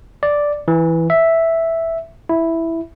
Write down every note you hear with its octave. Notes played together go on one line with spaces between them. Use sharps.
D5
E3
E5
E4